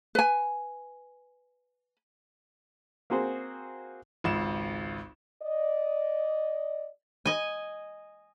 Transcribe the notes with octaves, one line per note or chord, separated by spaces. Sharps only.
B4 G#5
A#3 C4 F#4 G#4 C5
G#1 C#2 E7
D5 D#5
D#5 G#5